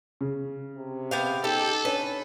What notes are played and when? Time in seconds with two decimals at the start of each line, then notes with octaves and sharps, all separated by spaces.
0.21 C#3
0.77 C3
1.11 B3 G4 F5
1.44 D#4 G4 A4
1.85 C#4 D4 B4 C#5